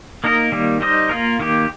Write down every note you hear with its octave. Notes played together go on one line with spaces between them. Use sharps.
A#3 D#4 A#4 D#5
D#3 G3 A#3
G3 D#4 C5 D#5
A#3 F4 A#4
D#3 A#3 G4